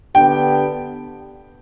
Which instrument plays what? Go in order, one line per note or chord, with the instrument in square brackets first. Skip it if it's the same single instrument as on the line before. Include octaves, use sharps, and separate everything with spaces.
[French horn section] D3 B3 D4 G4 [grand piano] G5